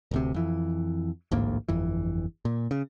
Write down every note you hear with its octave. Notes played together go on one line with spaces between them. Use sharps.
D1 D2 C3
F2 E3
A1 D2 G#2 A#3
G1 F2 E3
A#2
C#3